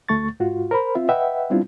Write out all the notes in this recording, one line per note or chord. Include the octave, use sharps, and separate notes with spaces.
D2 A3 C#6 A6
G#2 F4 F#4
A#4 C5 B5
C4 F4 E5
B4 D#5 E5 F#5 G5
G3 B3 C4 D4 E4 F4